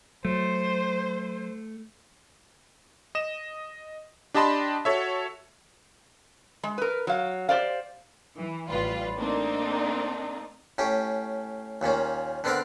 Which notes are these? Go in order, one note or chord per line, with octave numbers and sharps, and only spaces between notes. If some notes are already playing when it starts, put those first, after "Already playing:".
F#3 A3 C5
D#5 E7
D4 G4 D#5 A5 B5 C6
F#4 A4 C#5 E5
G#3
A#4 B4
F#3 F5
G4 C5 D5 F5
E3
A1 G3 F4 B4
A3 A#3 C4 D4 D#4
A2 C#4 G4
D#2 A#2 D#3 C#4
D3 B3 C4 D4 A#4 D5